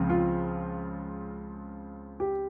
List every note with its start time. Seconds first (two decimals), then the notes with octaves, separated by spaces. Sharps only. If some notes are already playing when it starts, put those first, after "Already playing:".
Already playing: C#2 C#3 F3 C4
0.10 F4
2.20 G4